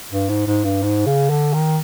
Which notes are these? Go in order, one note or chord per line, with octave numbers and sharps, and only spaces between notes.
G2
G#2
G#2
G2
G#2
C#3
D3
D#3